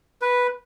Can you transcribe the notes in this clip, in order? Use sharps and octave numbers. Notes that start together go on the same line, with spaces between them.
B4